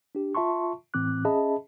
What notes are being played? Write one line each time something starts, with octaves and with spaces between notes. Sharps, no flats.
D4 G4
F4 E5 A5 C6 C#6
A2 E3 C4 D6 F#6
C#4 G#4 D#5 E5 A5 B5